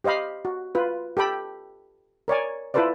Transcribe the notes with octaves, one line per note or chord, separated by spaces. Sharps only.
G4 C5 D#5 F5 B5
F#4
F4 B4
G4 A4 G5 B5
A#4 C#5 D5 G#5
E4 F4 A4 B4 C5 D5